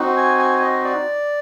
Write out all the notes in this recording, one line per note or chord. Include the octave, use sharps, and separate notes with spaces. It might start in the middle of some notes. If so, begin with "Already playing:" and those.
Already playing: C4 D#4 F#4
G#5
G#5
D#5
D5